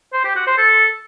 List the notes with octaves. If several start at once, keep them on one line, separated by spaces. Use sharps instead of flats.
C5
G4
F#4
C5
A4